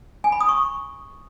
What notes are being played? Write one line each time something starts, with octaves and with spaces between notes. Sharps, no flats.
G#5
B5
D#6
C#6